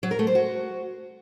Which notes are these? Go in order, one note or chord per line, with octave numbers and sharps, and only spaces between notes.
F#3
A#4
A3
C5
F#4